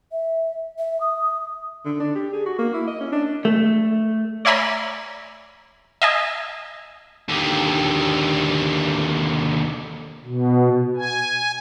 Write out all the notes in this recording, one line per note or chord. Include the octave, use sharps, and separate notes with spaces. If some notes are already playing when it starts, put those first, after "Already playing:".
E5
E5
D#6
D3
D4
G4
G#4
F#4
A#3
E4
D#5
C#4
D4
A3
C#5 D5 E5 G#5 A#5 B5
D#5 E5 G#5
D#2 D3
B2
G#5